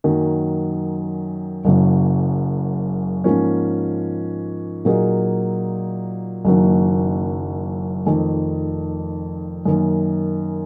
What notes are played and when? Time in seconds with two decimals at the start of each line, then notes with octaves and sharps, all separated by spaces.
0.04 F#2 D#3 F#3 A#3
1.65 F#1 F#2 C#3 F#3
3.24 G#2 F3 A#3 C#4
4.85 A#2 F#3 A#3 D#4 G#4
6.45 F#1 F#2 D#3 F#3 A#3
8.06 F1 F2 D#3
9.65 F#2 D#3 A#3